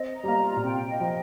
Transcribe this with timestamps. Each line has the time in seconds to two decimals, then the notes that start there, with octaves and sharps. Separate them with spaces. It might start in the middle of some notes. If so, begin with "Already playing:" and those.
Already playing: C4 D#5
0.16 A#5
0.24 G3
0.28 A#3
0.40 F4
0.56 A#2
0.64 C3 G5
0.88 D#5
1.00 F3